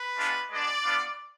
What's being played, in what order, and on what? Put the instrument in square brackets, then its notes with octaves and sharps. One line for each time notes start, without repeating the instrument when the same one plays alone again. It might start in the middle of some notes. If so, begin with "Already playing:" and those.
Already playing: [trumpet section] B4
G#3 B3 D4 F4
G#3 B3 D4 D5
B3 D4 F4